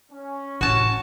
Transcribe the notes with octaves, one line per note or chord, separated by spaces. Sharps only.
C#4
A1 F#4 A5